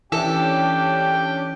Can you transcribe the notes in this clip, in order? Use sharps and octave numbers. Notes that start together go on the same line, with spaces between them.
E3 C#4 D4 G4 A4 G5